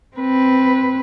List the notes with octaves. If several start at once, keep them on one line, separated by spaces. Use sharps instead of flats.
C4 B4